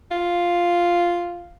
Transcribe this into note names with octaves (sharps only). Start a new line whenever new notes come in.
F4